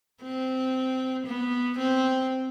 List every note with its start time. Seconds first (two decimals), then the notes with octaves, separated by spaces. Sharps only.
0.23 C4
1.26 B3
1.78 C4